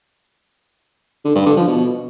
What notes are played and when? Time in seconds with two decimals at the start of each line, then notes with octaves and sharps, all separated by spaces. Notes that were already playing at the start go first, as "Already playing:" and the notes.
1.25 D3
1.35 G2
1.46 D3
1.57 F3
1.67 B2